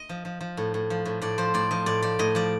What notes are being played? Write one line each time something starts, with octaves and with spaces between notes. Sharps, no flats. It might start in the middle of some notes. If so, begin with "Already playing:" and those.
Already playing: D#5
F3
F3
F3
A2
A2
F3
A2
A2 D5
F3 C5
A2 D5
F3 D#5
A2 D5
F3 D5
A2 D#5
F3 D5